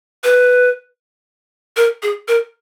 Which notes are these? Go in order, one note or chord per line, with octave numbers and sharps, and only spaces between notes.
B4
A#4
G#4
A#4